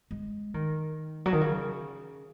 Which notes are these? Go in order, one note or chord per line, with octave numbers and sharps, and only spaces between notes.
G#3
D#3
F#3
D#3
C#3